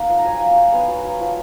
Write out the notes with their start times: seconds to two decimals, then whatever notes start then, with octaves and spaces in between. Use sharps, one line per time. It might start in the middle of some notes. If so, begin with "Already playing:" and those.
Already playing: A#3 D#4 F#5
0.09 F3
0.18 A#5
0.25 F#3 F5 G#5
0.40 F#3
0.51 F5
0.57 D#4
0.62 F#5
0.72 B3 F5 G#5
0.88 F#3
1.04 F#3
1.20 F3